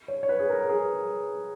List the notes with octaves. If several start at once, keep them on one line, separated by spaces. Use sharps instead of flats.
C#5
C#5
B4
G#4
A#4
G#4